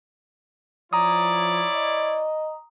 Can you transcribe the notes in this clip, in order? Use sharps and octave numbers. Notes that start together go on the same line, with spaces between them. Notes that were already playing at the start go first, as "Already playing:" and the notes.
F3 E4 C#5 D5 A#5 D#6
D#5